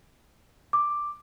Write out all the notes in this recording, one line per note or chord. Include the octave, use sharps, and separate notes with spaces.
D6